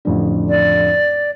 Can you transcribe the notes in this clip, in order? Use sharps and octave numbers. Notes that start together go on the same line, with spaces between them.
A1 F2 D3
D5